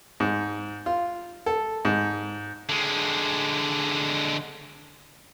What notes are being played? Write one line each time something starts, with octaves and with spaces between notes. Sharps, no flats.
G#2
F4
A4
G#2
D3 G#3